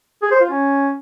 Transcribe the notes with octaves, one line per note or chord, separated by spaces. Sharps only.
G#4
C5
F4
C#4